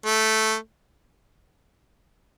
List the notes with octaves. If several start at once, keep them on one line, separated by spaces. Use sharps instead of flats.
A3